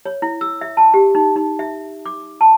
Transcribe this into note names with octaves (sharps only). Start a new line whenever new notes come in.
C#5
E4
E6
E5
A5
G4
D#4
D#4
E5
D6
A5